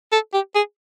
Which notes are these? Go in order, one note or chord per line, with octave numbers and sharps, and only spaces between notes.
A4
G4
G#4